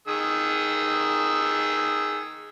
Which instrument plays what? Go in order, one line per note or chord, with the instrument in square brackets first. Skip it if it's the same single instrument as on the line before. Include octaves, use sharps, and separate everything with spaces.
[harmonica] D#3 G#4 E6